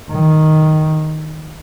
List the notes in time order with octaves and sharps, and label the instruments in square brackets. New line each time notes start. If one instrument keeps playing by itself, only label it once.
[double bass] D#3